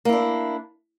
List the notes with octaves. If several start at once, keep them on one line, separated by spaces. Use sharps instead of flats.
A#3 D4 E4